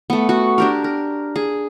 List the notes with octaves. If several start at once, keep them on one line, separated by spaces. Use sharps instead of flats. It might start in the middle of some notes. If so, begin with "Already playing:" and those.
A3 B3
F#4
D4 G4 A#4
A#4
G#4